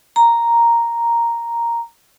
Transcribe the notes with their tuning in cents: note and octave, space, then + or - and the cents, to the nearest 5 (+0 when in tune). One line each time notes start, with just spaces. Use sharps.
A#5 +0